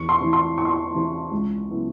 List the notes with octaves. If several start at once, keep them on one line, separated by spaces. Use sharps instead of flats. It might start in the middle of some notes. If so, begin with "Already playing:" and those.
Already playing: E2 C#6
C6
C3 E3
C6
E2 C#6
C6
C#6
C3 E3
C#2
C#3 F#3 B3 E4